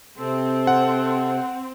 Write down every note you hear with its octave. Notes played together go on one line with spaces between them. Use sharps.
C3 C4 A4
F#5